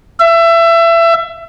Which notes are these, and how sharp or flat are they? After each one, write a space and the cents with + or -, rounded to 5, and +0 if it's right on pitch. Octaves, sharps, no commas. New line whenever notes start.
E5 +25